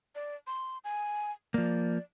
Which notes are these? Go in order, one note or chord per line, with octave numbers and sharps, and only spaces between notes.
D5
C6
G#5
F3 A#3 D5